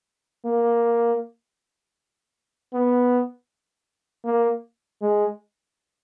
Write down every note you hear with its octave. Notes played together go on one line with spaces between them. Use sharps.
A#3
B3
A#3
G#3